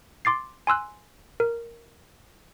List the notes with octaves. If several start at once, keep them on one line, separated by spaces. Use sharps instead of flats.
C6 D6 A6 C7
G#5 C6 E6 F#6
A#4